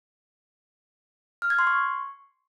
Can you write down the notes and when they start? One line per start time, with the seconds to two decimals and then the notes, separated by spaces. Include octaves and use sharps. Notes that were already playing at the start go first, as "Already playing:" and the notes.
1.42 F6
1.50 G#6
1.59 C6
1.67 C#6